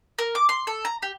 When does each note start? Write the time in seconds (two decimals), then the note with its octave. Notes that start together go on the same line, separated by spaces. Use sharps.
0.19 A#4
0.35 D6
0.49 C6
0.67 A4
0.85 A#5
1.03 G4